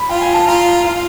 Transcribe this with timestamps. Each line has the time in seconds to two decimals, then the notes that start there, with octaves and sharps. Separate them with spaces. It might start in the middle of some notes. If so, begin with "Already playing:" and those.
Already playing: B5
0.09 F4 G5
0.22 G#5
0.34 A5
0.47 F4 A#5
0.84 F4 F5